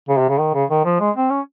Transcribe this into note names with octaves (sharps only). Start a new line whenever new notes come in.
C#3
C3
C#3
D#3
C#3
D#3
F3
G#3
C4
C#4